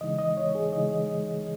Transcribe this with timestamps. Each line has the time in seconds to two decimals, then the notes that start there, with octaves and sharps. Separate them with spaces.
0.01 C#3 E3 G#3 D#4 D#5
0.18 D#5
0.37 C#5
0.55 G#4
0.73 C#3 E3 G#3 D#4 D#5